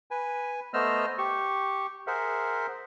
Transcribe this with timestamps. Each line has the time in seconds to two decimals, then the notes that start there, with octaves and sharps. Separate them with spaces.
0.11 B4 G#5
0.73 A3 B3 C5 D#5 E6 F6
1.18 G4 C#6
2.07 G#4 A#4 C5 E5 F#5